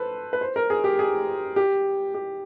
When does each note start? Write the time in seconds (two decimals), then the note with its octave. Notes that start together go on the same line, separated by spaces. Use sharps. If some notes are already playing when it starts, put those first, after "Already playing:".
Already playing: A4 B4 C5
0.33 B4
0.41 C5
0.56 A#4
0.70 G#4
0.84 G4
0.99 G#4
1.56 G4
2.14 G4